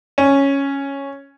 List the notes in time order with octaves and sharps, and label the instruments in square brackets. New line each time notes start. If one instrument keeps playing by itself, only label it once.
[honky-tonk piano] C#4